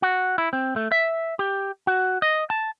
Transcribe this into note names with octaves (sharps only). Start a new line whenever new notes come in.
F#4
E4
C4
A3
E5
G4
F#4
D#5
A5